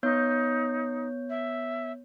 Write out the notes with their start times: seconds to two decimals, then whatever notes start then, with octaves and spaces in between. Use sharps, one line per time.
0.03 B3 D#4 C#5 G6
1.30 E5